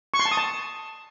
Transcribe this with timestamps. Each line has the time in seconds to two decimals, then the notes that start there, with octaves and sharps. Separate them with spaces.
0.14 C#6
0.20 C6
0.25 A5
0.31 D#6
0.37 A5